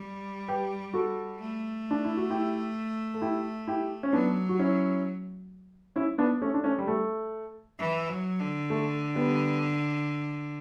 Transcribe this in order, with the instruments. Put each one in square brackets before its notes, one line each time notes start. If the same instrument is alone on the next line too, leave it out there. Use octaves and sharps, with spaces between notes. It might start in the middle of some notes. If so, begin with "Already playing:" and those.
Already playing: [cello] G3
[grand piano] G4 B4
F#4 A4
[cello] A3
[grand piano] D4
E4
F#4
E4 G4
A4
E4 G4
E4 G4
C#4
[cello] F#3 [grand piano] B3 D4
[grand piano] F#4
C#4 E4
C#4 E4
B3 D4
A3 C#4
D4
A3 C#4
G3
A3
[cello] E3
F#3
D3
[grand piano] A3
G3 B3